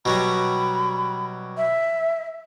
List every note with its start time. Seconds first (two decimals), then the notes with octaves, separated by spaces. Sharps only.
0.05 B2 F#3 G3 B5
1.57 E5